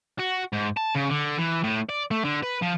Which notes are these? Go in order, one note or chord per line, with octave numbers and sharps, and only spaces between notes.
F#4
G#2
A5
C#3
D3
E3
A2
D5
A3
D3
B4
F3